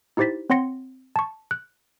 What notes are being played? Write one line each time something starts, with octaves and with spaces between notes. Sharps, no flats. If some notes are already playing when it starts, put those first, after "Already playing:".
D#4 E4 G4 C5 A6 B6
C4 C#5 F#5 C6 A#6 C#7
A5 C#6
F#6